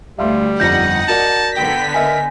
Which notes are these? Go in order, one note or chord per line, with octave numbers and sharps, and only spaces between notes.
D2 G3 E5 F5 C6
G1 F2 D#4 F#5 G6 A#6
F#4 A#4 D5 A5
D3 B3 G5 B6
A#4 D#5 E5 G#5